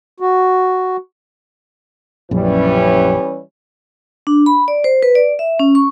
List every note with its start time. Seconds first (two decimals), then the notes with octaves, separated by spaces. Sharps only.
0.20 F#4
2.31 A#1 F#2 E3 G3 C#4
4.27 D4
4.46 B5
4.68 D5
4.84 C5
5.03 B4
5.15 D5
5.39 E5
5.59 C#4
5.75 C#6